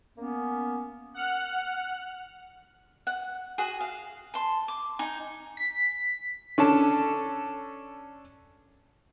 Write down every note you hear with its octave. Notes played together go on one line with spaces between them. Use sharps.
A#3 B3 C#4
F#5 F6 F#6
F#5
F#4 G#4
F5
A5 C6
D6
D#4 G#5
B6
C#4 D4 A4 A5